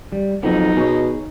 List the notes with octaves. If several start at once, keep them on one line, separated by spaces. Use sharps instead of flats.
G3
F2 F#3 A#3 B3 D#4
B2 G#4 C#5